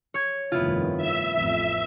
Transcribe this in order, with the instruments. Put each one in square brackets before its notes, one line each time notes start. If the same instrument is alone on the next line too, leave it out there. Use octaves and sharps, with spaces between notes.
[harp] C#5 G#6
[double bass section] F1 G2 D#3 [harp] B3 E4 F4
[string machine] E5
[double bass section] A1 F2